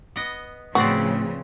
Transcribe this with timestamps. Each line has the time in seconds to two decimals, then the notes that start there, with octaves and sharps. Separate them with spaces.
0.16 B3 D#5
0.75 A2 C#3 F3 B3 C4 F#4 D5